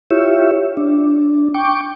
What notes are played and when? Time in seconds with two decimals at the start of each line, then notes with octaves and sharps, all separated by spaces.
0.11 E4 F4 G4 C#5 E5
0.77 D4
1.54 G5 C#6 D6